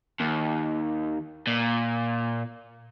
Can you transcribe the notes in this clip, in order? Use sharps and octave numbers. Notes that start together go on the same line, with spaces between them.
D#2
A#2